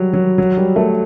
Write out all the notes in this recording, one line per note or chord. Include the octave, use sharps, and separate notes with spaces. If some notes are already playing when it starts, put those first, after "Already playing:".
Already playing: F#3 G3
F#3
F#3
G3
A3